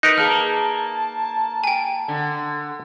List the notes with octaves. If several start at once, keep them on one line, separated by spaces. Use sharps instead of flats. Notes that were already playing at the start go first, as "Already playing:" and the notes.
D#4 A#4 B4 F#6
A#3 G#4 A5 F6
G5 G#5
D3